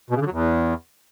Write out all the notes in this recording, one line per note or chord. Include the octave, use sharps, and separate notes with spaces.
B2
C#3
D3
F#3
E2